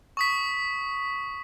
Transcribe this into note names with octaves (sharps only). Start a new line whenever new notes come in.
C#6 D#6 B6